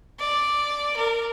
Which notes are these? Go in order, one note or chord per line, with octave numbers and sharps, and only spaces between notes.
D5
A#4